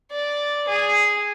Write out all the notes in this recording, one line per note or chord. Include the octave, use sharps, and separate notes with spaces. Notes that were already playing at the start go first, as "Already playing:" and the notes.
D5
G#4